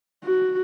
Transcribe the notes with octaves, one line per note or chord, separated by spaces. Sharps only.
F#4